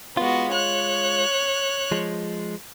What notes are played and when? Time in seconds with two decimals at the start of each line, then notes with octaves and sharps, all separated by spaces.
0.17 G#3 B3 F4 F#4
0.51 C#5 F#6
1.92 F3 G#3